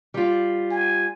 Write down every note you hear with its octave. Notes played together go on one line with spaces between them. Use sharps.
G3 F4
G#5